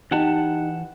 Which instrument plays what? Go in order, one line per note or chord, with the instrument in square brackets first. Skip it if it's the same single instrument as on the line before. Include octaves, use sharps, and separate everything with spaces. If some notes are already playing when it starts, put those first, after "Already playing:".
[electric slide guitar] E3 F#5 A5 [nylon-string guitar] D#4 G4 D#5